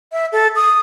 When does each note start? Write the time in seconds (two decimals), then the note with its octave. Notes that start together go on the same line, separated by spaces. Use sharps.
0.12 E5
0.32 A4
0.56 D#6